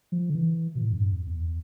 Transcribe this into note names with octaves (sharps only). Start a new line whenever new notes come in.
F3
D3
E3
B2
A2
F2
G2
F2
E2